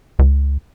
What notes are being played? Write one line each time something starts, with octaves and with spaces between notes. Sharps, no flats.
C#2